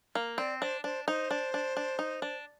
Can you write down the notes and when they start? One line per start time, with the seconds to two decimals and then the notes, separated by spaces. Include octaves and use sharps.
0.15 A#3
0.38 C4 D5
0.61 D4 C5
0.84 D4 C5
1.08 D#4 C5
1.31 D4
1.54 D4
1.77 D4
1.99 D#4
2.22 D4